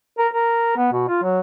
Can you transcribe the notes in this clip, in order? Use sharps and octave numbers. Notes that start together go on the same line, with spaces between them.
A#4
A#4
B3
B2
F4
F#3